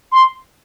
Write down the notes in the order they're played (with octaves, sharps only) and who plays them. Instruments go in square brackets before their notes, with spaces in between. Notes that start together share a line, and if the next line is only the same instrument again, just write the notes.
[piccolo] C6